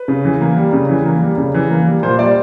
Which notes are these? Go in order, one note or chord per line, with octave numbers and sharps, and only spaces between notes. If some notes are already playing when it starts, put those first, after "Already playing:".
Already playing: B4
C#3
E3
A#3
G3
C#3
E3
A#3
G3
C#3
E3
A#3
G3
A#2 C5
G3 D5